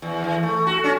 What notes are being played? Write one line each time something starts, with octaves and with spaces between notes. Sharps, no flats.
E2
E3
A3
F#4
C#4